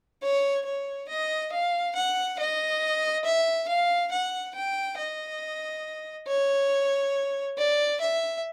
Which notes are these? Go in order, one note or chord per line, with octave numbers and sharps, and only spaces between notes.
C#5
C#5
D#5
F5
F#5
D#5
E5
F5
F#5
G5
D#5
C#5
D5
E5